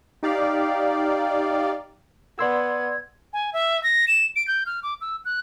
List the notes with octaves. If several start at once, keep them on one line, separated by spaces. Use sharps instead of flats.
D#4 G4 D5 F5
B3 D5 C6 E6 G#6
G#5
E5
A#6
E7
D7
G6
F6
D6
E6
F#6